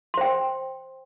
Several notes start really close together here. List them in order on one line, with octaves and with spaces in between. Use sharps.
C6 C5 G5